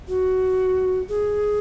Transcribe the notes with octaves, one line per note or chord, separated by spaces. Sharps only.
F#4
G#4